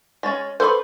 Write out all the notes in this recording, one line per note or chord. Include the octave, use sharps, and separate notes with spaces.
G#3 C#4 A6
A4 B4 C5 B5 C#6